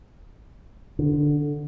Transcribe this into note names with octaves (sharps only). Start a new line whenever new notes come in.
D3